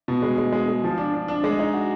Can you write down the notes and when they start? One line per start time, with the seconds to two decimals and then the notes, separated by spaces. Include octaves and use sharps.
0.08 B2
0.22 G#3
0.38 G#3
0.52 G#3
0.68 G#3
0.84 F3
0.98 D4
1.14 D4
1.28 D4
1.44 G#3
1.59 D#4
1.74 F#4